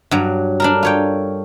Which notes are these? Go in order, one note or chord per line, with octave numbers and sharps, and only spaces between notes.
G2 F#3
D4 A4 A#4
F4 C#5 G5